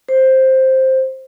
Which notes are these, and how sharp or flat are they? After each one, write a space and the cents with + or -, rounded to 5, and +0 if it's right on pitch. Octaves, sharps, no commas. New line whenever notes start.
C5 +5